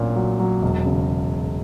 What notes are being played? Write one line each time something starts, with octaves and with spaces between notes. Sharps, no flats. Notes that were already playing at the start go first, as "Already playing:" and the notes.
Already playing: A#1 A#2 F#3 C#4
F#3
F#3
E1
C#3